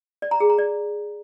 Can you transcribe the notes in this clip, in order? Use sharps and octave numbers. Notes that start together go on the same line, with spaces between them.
D5
A#5
G#4
A#5
D5